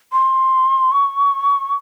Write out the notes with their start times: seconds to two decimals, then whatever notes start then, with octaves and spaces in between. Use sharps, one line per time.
0.13 C6
0.92 C#6